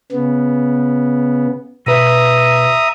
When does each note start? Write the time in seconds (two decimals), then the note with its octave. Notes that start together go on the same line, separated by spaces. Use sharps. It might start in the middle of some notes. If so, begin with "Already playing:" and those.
0.12 C#3 B3
1.86 B2 B4 E5 A#5 D#6